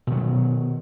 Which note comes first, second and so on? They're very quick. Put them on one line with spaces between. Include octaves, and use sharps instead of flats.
B2 D#3 F#3